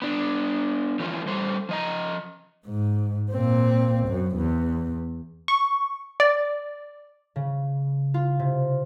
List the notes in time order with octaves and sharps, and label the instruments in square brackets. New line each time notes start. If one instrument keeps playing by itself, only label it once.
[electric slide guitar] B3 D4
E3 F3 A3 C#4 E4 F4
G3 A3 A4 C5
F3 D#5 A#5
[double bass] G#2
A#2 C4
F#2
E2
[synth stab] C#6
D5
[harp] C#3
F4
C3